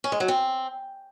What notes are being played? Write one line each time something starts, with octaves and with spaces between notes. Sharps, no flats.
C#4
G#3
F#3
C4